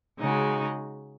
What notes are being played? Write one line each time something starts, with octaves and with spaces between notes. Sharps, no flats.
C#3 G#3 D#4 F#4